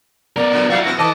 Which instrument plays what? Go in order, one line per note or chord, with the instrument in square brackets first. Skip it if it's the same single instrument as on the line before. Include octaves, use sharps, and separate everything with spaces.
[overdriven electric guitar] B3 A#4 [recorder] D5
[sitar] A#2 D3 F#3
[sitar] A#2 F#3 A3 [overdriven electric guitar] E4 F#4 [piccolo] F5
[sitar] F#2 B2 B3 [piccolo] A#6
[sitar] D#3 A4 B4 [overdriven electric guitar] D#5 [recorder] A5 [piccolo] D6